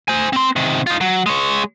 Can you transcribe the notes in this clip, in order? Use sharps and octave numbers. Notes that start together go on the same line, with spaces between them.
C5 G#5
C4 C6
C3 D#3
D#4 F4
F#3
G#3 C#5